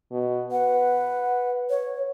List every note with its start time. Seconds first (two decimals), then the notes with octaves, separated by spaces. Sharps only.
0.11 B2
0.51 B4 F#5
1.70 C#5